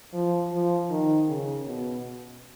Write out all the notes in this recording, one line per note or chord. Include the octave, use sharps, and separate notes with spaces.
F3
F3
D#3
C#3
B2